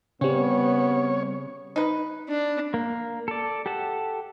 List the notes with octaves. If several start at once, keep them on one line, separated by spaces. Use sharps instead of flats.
C#3 G3 B3 C4 C#5
D#4 B4
D4
A#3
A4 D5
G4 A4 F#5 A5